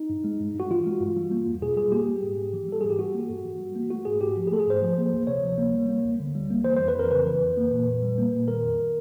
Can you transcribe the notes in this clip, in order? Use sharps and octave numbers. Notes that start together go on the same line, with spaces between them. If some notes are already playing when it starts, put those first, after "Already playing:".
Already playing: D#4
G2
G#3
G2
G2 F#4
E3 F4
G#3
G2
G3
A#3
E2
B2 G#4
G3 G#4
A#3 G4
G3
G#2
G#2
E3
G3 A4
G#2 G#4
G4
G3 F#4
A#3
G2
E3
G3
A#3
A3 F#4
G#2 G#4
G#2 G4
F3
G#4
A3 A4
G#4
G#2 C5
F3
A#3
D2
C3 C#5
F3
A#3
G3
A#3
D2
D3
G3
A#3
E3 C5
F2 C5
B4
F2 A#4
C#3 B4
E3
F2
A#3
A#2
A#2
G3
A#3
A#2
D#3 A#4
F2